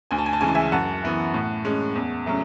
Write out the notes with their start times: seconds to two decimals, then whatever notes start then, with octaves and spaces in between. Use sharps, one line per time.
0.11 D2 G#5
0.18 A5
0.26 G#5
0.33 A5
0.41 C#3 E3 G#3 G#5
0.48 A5
0.55 E5 G#5
0.72 F#2 F#5 A5
1.03 E3 B3 E4
1.34 A2
1.65 G#3 C#4
1.95 E2
2.26 C#3 F#3 A3